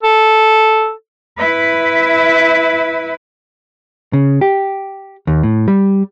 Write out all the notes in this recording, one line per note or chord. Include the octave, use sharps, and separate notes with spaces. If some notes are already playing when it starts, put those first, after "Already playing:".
A4
E4 B4
C#3
G4
D#2
A2
G3